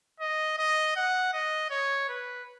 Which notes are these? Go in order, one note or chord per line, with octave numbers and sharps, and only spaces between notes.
D#5
D#5
F#5
D#5
C#5
B4